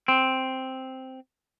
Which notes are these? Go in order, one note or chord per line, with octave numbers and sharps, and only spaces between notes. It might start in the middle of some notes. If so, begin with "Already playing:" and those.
C4